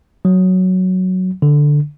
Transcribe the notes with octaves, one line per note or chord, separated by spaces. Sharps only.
F#3
D3